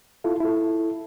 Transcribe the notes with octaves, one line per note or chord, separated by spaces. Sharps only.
E4 F4 A4
E4 A4